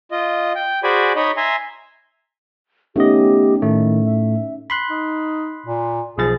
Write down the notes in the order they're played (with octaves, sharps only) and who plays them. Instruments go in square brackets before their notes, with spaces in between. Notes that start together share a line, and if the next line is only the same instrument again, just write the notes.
[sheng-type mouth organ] F4 D#5
G5
F#4 G#4 C5 D5 G#5 B5
D#4 C#5 D#5 B5
E5 G#5 A#5 C6
[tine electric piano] A3 B3 D#5 [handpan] C#4 D#4 [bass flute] G4
[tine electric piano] A2 A3 [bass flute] D#3
[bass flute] E5
[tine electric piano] B5 C6 F#6
[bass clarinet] D#4
A#2
[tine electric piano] B1 F3 A6 [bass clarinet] G#4